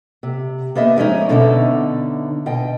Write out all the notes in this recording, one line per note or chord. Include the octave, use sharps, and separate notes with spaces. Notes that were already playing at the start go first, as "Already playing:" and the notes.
C3
A#3 B3 D#5 E5
D3 F3 G#3 C#4 D#4
B2 D3 C#4 D#4 D5 E5
B2 D#5 G5